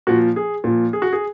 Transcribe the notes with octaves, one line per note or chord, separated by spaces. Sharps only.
A#2 F3 F#4
G#4
A#2 F3
G#4
F#4
G#4